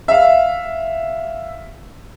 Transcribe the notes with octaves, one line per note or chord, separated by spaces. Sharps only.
E5 F5